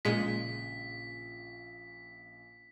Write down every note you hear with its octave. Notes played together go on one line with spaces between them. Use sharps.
A#1 A#2 C#3 G#3 B6